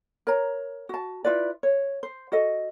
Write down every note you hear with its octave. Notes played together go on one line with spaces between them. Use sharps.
A#4 C#5 A#5
F#4 A5
E4 F4 B4 D5
C#5
C5
F#4 A4 D#5